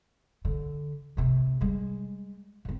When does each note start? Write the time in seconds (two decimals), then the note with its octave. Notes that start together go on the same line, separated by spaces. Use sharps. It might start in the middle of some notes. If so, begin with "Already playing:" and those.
0.45 D3
1.17 G#1 C3
1.61 G3 G#3
2.65 G#2 C4